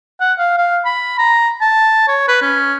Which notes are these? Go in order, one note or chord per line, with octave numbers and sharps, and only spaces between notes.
F#5
F5
F5
B5
A#5
A5
C#5
B4
C#4